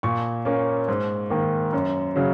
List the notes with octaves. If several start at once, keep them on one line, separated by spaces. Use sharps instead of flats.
A#2 C#6
A#3 C#4
G#2
D#3 A#3
F#2
C#3 F#3